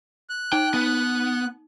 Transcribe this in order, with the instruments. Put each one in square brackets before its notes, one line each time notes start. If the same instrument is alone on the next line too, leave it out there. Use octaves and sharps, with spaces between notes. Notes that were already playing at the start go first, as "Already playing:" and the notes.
[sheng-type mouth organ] F#6
[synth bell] D#4 [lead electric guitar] G5
[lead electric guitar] B3